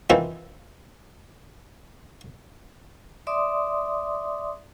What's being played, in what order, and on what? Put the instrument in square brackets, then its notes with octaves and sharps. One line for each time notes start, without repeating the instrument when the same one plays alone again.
[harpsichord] D#3 E3 C4 F4
[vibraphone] D5 E5 C6 D6 D#6